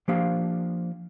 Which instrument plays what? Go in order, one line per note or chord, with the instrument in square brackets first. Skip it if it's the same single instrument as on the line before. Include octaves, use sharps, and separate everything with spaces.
[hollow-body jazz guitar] F3 A#3 D4 G4 C5 F5